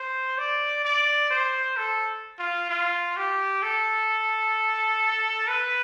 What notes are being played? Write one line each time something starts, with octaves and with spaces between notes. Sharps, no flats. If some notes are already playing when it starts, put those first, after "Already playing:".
Already playing: C5
D5
D5
C5
A4
F4
F4
G4
A4
B4